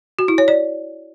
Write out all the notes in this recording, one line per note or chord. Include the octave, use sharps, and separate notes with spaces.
F#4
E4
C#5
D5